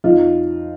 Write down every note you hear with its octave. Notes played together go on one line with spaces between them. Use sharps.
F2 D#4 F4